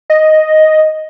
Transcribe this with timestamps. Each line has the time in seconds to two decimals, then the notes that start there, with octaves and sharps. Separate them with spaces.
0.10 D#5